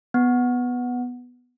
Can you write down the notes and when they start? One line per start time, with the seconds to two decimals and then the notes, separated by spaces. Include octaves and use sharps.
0.14 B3